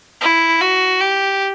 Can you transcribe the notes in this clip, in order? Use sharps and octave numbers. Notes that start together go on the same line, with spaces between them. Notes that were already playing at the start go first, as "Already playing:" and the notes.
E4
F#4
G4